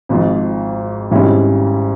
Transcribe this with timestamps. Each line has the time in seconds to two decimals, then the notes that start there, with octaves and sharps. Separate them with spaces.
0.09 G#1 G#2 F3
1.11 G#1 G#2 G3 C#4 E4